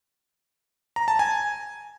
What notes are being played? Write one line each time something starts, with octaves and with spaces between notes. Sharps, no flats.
A#5
A5
G#5